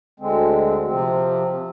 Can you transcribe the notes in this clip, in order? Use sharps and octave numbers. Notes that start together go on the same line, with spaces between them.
D2 D3 G#3 C4
C3 F3 C4